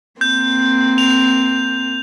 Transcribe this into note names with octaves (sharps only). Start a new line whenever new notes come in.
A#3 C4 G6
F7